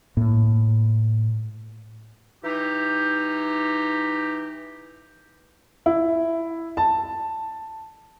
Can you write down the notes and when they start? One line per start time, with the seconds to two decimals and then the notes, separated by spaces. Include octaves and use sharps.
0.17 A2 A#3
2.44 E3 D#4 G4
5.86 E4
6.77 A5